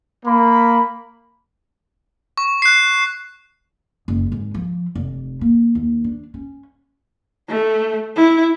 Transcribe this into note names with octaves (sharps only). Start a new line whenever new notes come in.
A#3 B5
C#6
F#6 C7
F#1
G#1
F3
F1
A#3
D#2
D4
C#4
A3
E4